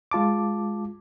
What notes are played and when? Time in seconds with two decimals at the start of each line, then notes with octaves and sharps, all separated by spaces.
0.11 G#3 F4 A5 D6